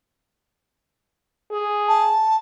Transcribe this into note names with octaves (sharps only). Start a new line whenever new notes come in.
G#4
A5